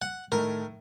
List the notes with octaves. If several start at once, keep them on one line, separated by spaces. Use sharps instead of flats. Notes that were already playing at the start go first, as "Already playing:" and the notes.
F#5
A2 D#3 A3 A#4